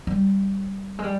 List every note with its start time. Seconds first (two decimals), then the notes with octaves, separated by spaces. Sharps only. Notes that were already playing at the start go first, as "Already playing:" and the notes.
0.07 G3
0.99 G#3
1.04 G3